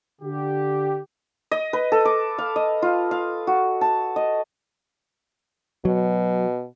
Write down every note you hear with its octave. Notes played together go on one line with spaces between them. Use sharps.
D3 G4
D#5
B4
A4
D6
F5
D#5
F4
F5
F#4
A5
D#5
B2 F#3